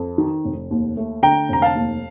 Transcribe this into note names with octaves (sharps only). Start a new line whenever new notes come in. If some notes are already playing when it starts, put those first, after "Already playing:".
Already playing: F2
D#3
F1
D#2
A3
D3 G5 A#5
F1 A#5
F5 A5
D#2